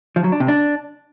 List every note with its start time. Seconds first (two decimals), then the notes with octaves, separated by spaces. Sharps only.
0.16 F3
0.24 F#3
0.32 D4
0.40 C3
0.48 D4